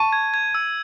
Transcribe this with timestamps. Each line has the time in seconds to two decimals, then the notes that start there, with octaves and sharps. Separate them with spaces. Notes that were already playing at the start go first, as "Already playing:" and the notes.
Already playing: A5 C#6 D#7
0.13 G#6
0.34 G#6
0.55 E6